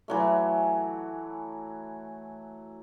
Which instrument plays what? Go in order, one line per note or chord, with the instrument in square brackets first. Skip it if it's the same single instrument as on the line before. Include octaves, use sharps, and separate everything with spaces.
[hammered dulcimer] E3 F#3 A3